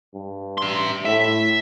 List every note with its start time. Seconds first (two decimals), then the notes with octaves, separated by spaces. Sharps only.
0.15 G2
0.58 E5 C6
1.06 A2 E5